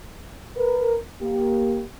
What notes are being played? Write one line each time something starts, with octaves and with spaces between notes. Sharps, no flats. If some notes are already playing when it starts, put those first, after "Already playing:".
A#4 B4
A#3 G4